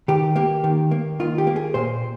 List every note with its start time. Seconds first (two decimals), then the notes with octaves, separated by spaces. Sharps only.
0.08 D#3 G4
0.36 A#3 G4
0.64 D#3
0.91 A#3
1.20 D#3 F4
1.38 G4
1.47 A#3
1.56 G#4
1.74 A#2 C5